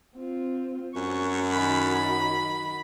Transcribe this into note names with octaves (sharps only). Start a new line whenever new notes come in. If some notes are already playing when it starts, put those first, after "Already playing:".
C4 F4
F#2 C#6
D#3 F#4 B5